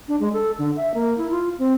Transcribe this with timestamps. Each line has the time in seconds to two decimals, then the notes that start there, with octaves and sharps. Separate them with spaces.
0.08 D4
0.20 G#3
0.33 A4
0.59 D3
0.77 E5
0.94 A#3
1.18 E4
1.31 F4
1.59 C4